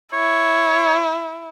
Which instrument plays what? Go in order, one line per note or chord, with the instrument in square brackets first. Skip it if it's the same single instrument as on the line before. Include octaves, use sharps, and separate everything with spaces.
[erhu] E4 [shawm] C#5